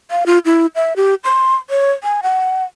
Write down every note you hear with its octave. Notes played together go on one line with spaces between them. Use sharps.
F5
F4
E4
E5
G4
C6
C#5
G#5
F#5